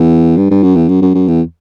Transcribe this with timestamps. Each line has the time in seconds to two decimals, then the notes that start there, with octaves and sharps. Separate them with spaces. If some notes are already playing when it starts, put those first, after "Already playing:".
Already playing: E2
0.37 G2
0.50 G2
0.63 F#2
0.75 E2
0.88 F#2
1.02 F#2
1.14 F#2
1.28 E2